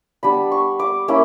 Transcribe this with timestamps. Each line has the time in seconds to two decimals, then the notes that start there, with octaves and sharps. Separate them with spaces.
0.23 G3 B3 D4 B5
0.52 C#6
0.79 D6
1.08 A#3 C#4 E4